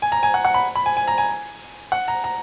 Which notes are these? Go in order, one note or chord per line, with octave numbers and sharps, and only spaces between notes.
G#5
A#5
G#5
F#5
F#5
B5
B5
G#5
G#5
A#5
G#5
F#5
A#5
A#5